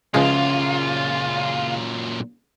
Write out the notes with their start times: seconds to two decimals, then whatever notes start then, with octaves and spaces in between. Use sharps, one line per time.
0.14 C#2 F#2 A#2 C#3 F3 G#3 F4